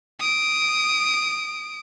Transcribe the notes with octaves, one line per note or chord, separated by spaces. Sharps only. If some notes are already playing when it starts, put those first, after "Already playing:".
D#6 D7